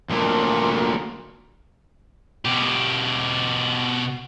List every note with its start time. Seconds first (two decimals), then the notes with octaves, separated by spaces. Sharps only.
0.11 D2 A#2
2.45 B2 G4